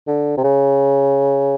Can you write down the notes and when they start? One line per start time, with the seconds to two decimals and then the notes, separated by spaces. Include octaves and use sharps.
0.07 D3
0.37 C3
0.44 C#3